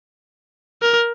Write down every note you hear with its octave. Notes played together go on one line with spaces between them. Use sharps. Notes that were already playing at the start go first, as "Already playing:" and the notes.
A#4